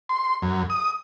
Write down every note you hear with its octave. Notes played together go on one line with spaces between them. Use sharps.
C6
F#2
D#6